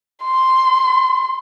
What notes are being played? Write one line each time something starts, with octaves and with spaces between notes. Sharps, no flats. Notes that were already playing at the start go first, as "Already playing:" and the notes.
C6